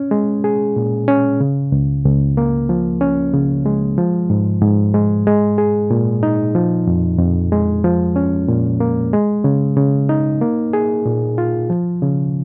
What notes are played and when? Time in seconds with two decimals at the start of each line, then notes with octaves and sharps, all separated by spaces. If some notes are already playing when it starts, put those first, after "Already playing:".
Already playing: C#4
0.11 G#3
0.44 G#4
0.76 A#2
1.08 C#4
1.41 C#3
1.72 C#2
2.05 C#2
2.37 A#3
2.69 F3
3.01 C#4
3.34 C#3
3.66 G#3
3.98 F3
4.30 G#2
4.62 G#2
4.94 G#3
5.27 G#3
5.58 G#4
5.91 A#2
6.23 D#4
6.55 F3
6.87 F2
7.19 F2
7.52 G#3
7.84 F3
8.16 C#4
8.48 A#2
8.80 A#3
9.13 G#3
9.44 C#3
9.77 C#3
10.09 D#4
10.41 A#3
10.73 G#4
11.06 A#2
11.38 F4
11.70 F3
12.02 C#3